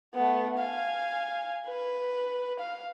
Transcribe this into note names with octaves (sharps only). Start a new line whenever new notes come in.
A3 B3
F5 G#5
B4
F5